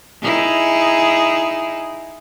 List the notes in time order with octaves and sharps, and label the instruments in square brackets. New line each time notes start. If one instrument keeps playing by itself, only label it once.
[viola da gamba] D#4 E4 G#4